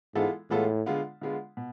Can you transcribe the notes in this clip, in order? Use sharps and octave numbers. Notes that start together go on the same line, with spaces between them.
G#2 E3 G#3 B3 F4 A4
A2 E3 G#3 B3 F4 A4
D3 G#3 B3 F4
D3 G#3 B3 F4
B2